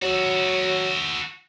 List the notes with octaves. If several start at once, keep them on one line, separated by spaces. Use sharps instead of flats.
F#3 F#4 A4